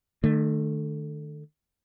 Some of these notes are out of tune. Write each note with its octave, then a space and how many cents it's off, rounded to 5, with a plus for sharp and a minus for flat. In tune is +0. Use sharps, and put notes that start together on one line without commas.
D#3 -45 A3 +0